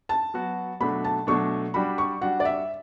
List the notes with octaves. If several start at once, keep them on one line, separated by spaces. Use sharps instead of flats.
A5
F#3 B3 F#4
B2 F#3 A3 D4 B5
A5
B2 F#3 A3 D4 C#6
G3 D4 F#4 B5
C#6
G3 D4 F#4 F#5
D5
E5